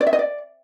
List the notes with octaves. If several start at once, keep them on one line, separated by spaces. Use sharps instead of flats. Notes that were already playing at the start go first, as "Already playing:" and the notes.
D5
E5
D#5
D5